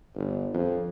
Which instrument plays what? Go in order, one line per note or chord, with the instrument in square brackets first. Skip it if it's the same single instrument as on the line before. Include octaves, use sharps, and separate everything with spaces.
[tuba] G1
F2